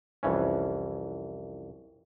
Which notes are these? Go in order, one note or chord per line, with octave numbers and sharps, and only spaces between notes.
C2 F2 E3 C#4